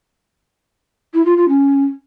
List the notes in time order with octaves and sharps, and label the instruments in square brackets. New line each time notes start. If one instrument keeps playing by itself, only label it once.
[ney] E4
F4
F4
C#4